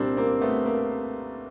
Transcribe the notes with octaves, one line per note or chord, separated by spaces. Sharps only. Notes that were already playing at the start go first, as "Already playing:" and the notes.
Already playing: C2 A#2 G3 C4 D4
A#3 C4
A3 B3
A#3